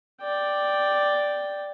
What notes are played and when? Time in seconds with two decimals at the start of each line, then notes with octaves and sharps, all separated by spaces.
0.22 D5 G5